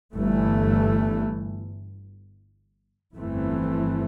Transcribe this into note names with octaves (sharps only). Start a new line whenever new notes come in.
G1 G2 E3 A3
G1 F2 E3 A3 C4